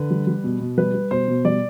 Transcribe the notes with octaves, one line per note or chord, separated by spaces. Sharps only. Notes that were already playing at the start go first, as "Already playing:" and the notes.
Already playing: D3 B4
G3
G3
B2
B2
G3 B4
G3
B2 C5
B2
G3 D5